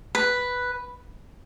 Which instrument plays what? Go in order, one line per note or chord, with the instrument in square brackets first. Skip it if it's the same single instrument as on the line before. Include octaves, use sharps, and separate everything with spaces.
[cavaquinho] B4